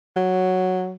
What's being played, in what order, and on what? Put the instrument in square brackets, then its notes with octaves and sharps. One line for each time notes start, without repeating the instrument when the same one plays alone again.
[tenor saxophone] F#3